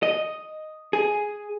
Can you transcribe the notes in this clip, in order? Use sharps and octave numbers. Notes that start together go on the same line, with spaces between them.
D#5
G#4